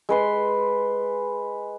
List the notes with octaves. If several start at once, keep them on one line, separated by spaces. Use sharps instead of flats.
G#3 B4 C6